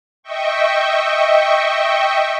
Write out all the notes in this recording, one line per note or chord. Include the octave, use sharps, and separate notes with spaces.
D#5 E5 G5 C#6